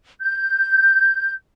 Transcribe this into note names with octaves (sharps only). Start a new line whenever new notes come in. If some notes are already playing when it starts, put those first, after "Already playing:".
G6